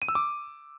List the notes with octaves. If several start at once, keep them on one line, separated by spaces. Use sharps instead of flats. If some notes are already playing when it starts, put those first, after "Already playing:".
D#7
E6
D6